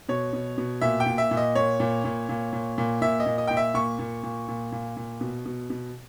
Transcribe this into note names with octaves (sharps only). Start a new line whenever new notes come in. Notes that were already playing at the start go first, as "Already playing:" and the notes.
B2 C#5
B2
B2
A#2 E5
G5
A#2
E5
A#2
D#5
A#2 C#5
A#2
A#2
A#2
A#2
A#2
A#2 E5
D#5
A#2
D#5
A#2 G5
E5
A#2 C#6
A#2
A#2
A#2
A#2
A#2
B2
B2
B2